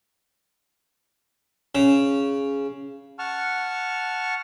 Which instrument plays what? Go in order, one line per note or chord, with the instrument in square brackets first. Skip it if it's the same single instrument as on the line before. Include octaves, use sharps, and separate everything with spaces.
[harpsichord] C#3
[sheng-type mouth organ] F#5 A5 C#6 F6